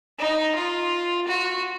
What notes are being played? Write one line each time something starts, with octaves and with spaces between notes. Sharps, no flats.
D#4
F4
F#4